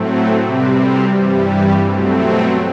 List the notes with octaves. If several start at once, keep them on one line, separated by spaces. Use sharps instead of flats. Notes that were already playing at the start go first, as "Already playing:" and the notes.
Already playing: A2 F#3 A3 C4
C3 G3 C4 G4 B4
G2 E3 G3
G4 B4
B2 F#3 A3 C4